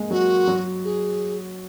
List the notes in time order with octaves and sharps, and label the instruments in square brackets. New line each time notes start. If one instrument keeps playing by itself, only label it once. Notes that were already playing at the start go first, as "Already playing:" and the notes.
Already playing: [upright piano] G#3 A#3
[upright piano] F#3 [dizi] F#4
[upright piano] F#3
[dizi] G#4